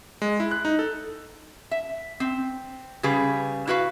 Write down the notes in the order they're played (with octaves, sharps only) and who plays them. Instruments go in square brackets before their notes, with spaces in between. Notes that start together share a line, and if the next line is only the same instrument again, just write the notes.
[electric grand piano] G#3
E4
F#6
D#4
A4
[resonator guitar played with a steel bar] E5
C4
C#3 G3 G#4 B4
E4 F#4 B4 F5